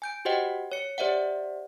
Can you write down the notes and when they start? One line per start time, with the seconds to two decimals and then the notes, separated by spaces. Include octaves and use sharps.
0.02 G#5 G6 D7
0.25 F#4 G4 C5 D#5 F#5 G5
0.72 C#5 C#7
0.98 G4 C5 D5 E5 F#5